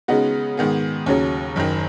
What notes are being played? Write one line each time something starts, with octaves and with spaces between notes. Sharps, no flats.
C#3 G#3 B3 D#4 F#4
G#2 D#3 B3 G#4
D#2 C#3 F#3 C#4
F#1 F#2 D#3